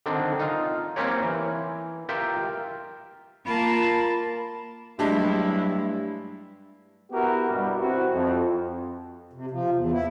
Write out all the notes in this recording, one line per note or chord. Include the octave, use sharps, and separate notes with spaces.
D3 D#3 C4 D4
D#4 F4
A#3 C4 C#4 G4 A#4 C#5
E3
F4 G4 A#4 E5 G5
A#3 F4 A#4 A5 B5
G2 F#3 G#3 A3 D4 E4 G4
B3 E4 F#4 G4 A#4
G2 B2 G3
C4 E4 F#4
F2
C3
F3
E2
E4